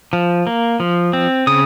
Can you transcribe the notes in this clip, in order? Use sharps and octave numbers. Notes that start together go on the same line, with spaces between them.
F3
A#3
F3
C4
C#3 D#6